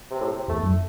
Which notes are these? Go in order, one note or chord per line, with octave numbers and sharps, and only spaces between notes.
C3
A2
C3
E2 A3
F#2